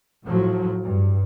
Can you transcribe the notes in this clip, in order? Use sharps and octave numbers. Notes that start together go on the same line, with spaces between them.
A2 F3 F#3
G2